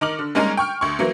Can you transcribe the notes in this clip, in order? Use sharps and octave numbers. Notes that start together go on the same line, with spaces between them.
D#3 D#4 D6 F6 F#7
D3
G3 G#3 A#3 C#4 D#4 A#4
G5 C#6 F6
D2 C#6
E3 F#3 A#3